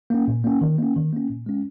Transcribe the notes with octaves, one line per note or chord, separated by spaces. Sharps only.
A#3 C#4
A#2
A#3 C#4
D#3
A#3 C#4
D#3
A#3 C#4
A#2
G#3 C#4